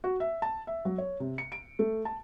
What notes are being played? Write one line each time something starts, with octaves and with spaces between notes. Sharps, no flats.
F#4
E5
A5
E5
F#3
C#5
C3
C#7
D7
A3
A5